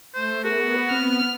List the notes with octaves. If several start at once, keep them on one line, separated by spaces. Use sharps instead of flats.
A3 C5
B3 F#4 G#4 A#4
C4 F6